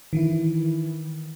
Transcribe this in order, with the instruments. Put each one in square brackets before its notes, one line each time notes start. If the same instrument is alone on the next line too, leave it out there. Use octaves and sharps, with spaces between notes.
[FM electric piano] D#3 E3 E4